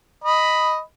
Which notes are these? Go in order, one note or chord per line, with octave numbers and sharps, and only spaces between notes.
D#5 B5